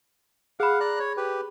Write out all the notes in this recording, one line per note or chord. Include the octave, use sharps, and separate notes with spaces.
G#4 F5 F#5 B5
D5 A#5 F#6
C#5
G4 B4